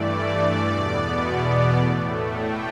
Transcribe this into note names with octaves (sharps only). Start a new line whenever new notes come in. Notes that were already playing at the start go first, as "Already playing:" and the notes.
Already playing: G2 E3 A3 D5
E2 B2 B3
A2 A3
G5